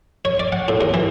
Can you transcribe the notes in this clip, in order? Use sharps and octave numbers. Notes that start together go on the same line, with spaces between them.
C#5
D5
F#5
A2
D#2
E3